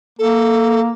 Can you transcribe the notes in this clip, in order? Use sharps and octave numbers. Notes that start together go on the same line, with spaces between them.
A#3 A4